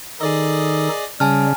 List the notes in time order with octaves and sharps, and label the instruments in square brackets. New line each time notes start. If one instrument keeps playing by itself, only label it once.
[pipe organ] D#3 D#4 A4 [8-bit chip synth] G#4 D5 D#5
[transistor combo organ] C#3 [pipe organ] G3 [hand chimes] G#5 A5 F6